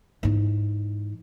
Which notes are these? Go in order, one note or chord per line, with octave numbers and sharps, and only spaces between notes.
G#2 E3